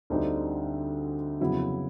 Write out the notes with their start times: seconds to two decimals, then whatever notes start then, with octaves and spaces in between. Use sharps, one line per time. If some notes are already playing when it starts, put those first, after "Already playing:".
0.10 D2 D3 G3 C4 D#4
1.41 F2 C#3 F#3 B3 E4